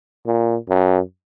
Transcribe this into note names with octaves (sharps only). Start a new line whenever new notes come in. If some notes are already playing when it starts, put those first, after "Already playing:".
A#2
F#2